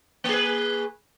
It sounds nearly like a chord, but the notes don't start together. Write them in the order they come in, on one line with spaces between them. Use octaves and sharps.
A#3 G#4 B4